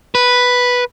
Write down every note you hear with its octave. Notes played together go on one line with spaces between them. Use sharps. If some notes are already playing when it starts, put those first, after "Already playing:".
B4